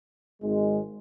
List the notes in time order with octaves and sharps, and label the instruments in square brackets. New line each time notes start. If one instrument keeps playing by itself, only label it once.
[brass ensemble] G#1 G#3